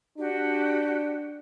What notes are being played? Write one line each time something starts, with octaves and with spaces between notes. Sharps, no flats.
D4 F#4 G4